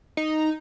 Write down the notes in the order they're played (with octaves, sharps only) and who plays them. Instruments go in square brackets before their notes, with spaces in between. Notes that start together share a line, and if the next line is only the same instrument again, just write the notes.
[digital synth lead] D#4